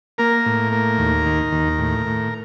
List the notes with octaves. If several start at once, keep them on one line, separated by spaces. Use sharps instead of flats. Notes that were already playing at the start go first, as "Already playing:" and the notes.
A#3 A#4
A2
A#3
D#2
D#3
D#2
A2
A2